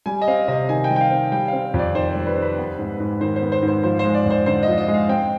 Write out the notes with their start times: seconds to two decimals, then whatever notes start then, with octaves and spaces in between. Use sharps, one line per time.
0.06 G3 G#5
0.22 D#5
0.28 C4 F5
0.48 C3 D#5
0.69 D#3 G#5
0.84 G5
0.90 G3
0.96 G5
1.01 F5
1.11 C4
1.32 G3 G5
1.48 C4 F5
1.74 F2
1.79 D5
1.95 D#3 C5
2.11 D5
2.16 G3
2.26 B4
2.36 C4
2.42 B4
2.58 B3
2.79 G#2
3.00 G#2
3.21 D#3 C5
3.36 C5
3.42 B3
3.52 C5
3.62 G#2
3.68 C5
3.83 F3 C5
3.99 G#3 C5
4.14 D5
4.26 F2 C5
4.46 D3 C5
4.63 F3 D#5
4.78 D#5
4.88 G#3
4.94 F5
5.09 C4 G5